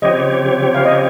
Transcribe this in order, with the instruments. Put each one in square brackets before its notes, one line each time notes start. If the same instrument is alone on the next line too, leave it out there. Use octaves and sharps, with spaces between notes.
[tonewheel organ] C#3 F3 C4 G4 C#5 [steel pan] D#5
[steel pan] F5
D#5